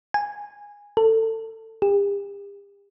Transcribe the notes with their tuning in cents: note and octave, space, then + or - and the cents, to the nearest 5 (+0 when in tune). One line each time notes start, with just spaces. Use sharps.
G#5 -15
A4 +25
G4 +40